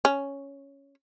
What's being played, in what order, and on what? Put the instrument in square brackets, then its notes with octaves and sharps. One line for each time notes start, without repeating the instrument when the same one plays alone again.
[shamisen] C#4